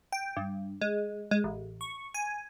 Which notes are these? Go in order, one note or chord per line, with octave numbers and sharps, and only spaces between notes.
G5
G2
G#3
G#3
A1
C#6
G#5